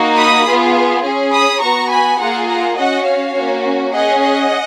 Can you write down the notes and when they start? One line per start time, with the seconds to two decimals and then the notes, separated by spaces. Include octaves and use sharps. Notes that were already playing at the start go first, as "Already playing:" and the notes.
Already playing: A#3 D#4 F#4
0.16 B5 D#6
0.46 B3 F4 G#4
1.03 C#4 G#4
1.32 B5 D#6
1.62 B3 F#4 A#5 C#6
1.90 G#5 B5
2.19 A#3 F4 G#4 F#5 A#5
2.48 F#5 A#5
2.77 C#4 F#4 D#5 F#5
3.06 C#5 F5
3.35 A#3 C#4 F#4
3.93 C#4 G#4 D#5 F#5
4.22 D#5 F#5